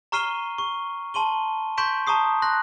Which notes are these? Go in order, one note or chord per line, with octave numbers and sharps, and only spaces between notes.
A#5 C#6 F6 C7 D#7 G7
C#6
A5 C6 D#7 G7
C6 C#6 G6 B6 D7 E7
A5 A#5 C#6 D#6 C7
C6 F#6 A#6